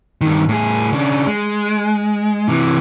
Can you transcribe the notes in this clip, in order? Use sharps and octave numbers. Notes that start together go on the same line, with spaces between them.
G2 D#3
A2 G#4
C#3 D4
G#3
C3 E3